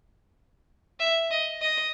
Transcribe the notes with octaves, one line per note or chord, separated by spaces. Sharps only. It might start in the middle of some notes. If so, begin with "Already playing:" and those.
E5
D#5
D#5